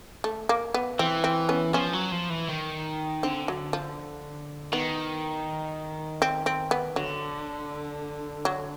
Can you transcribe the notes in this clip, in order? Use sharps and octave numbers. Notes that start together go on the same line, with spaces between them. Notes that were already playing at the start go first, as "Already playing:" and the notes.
A3
A#3
B3
E3 C4
C4
B3 C#4
F3 B3 C#4
F#3
F3
E3
D#3
D3 C4
F#3
F3
D#3 B3
C4
C4
B3
D3 F#3
F#3